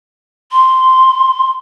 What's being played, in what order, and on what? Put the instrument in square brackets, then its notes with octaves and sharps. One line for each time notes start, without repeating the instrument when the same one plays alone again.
[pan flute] C6